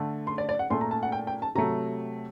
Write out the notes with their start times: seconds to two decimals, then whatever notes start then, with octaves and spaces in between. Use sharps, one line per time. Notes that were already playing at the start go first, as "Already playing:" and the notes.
Already playing: D3 A3
0.27 C6
0.38 D5
0.49 D5
0.59 F#5
0.70 A#2 A3 C6
0.81 A#5
0.91 A5
1.03 F#5
1.12 G5
1.27 G5
1.42 A5
1.55 C3 F#3 A3 A#5